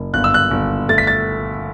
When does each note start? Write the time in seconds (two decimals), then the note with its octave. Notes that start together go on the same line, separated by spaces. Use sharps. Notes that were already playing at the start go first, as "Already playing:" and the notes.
Already playing: F#1
0.13 G1 F#6
0.24 E6
0.34 F#6
0.51 G1
0.89 A3 A6
0.98 B6
1.07 A6